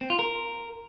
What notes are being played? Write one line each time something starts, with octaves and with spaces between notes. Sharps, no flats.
C4
F4
A#4